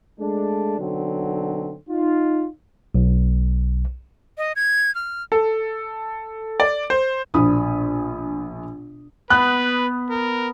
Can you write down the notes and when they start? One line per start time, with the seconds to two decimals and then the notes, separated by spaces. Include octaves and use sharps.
0.19 G#3 A3 D4
0.78 B1 D3 F#3 C4
1.89 D#4 F4
2.95 B1
4.38 D#5
4.56 G#6
4.95 F6
5.32 A4
6.60 D5
6.90 C5
7.34 A#1 B2 D4 B5 D#6
9.30 B3 B4 F#6
10.10 A#4